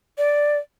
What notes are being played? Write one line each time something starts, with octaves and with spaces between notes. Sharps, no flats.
D5